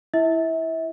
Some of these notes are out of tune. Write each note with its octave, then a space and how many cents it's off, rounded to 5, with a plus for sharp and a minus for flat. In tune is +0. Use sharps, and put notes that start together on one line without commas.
E4 +0 E5 -30